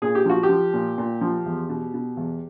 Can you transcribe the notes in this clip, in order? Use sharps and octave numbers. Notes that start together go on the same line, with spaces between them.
A#2 G#4
G4
F3 F#4
G4
F3
A#2
A#2
F3
E2
B2
B2
E2